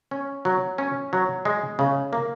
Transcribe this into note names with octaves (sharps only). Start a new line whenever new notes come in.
C#4
F#3
C#4
F#3
G#3
C#3
A#3